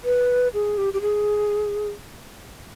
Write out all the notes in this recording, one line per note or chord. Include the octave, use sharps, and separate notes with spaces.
B4
G#4
G4
G4
G#4